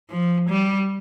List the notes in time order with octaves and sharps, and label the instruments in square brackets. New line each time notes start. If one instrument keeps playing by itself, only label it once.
[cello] F3
G3